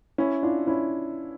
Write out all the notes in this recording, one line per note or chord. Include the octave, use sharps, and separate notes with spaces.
C#4 E4
D4 F4
C#4 E4